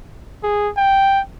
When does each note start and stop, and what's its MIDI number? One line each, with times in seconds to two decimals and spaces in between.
0.43 0.69 68
0.77 1.20 79